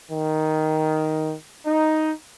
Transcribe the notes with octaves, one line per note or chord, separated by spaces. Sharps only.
D#3
D#4